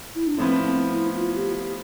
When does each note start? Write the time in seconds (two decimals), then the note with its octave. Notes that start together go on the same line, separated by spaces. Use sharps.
0.15 E4
0.27 D4
0.38 A2 F3 B3 C4
0.64 C4
0.90 E4
1.15 F4
1.35 G4